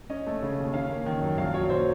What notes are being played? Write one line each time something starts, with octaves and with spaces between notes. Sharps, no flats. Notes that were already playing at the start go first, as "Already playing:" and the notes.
C#4 D#5
A3
C#3
D#2
C#4 F5
A#3
D#3
F#2
A#1 F5
F#3 C#5
A#2 C5